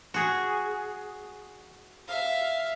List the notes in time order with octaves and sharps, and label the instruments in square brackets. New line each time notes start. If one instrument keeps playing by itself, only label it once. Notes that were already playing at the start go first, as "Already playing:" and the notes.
[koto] F#4 G#4
[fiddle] E5 F5